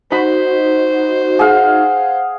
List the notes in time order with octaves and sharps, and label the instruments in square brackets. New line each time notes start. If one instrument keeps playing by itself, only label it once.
[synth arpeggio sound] D#4 F#4 [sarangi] C5 [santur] B5
[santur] G#4 F5 [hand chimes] F#5